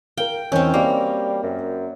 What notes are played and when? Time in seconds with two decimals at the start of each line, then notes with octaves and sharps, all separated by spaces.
0.17 A#4 F5 G5
0.52 E2 D#3 C4 C#4 G6
0.74 G3 A#3 F#4 D#5 F5
1.43 F#2